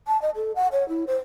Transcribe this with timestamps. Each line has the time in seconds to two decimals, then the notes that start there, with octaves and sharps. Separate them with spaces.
0.07 A5
0.22 D#5
0.35 A4
0.56 F#5
0.72 C#5
0.89 E4
1.07 C5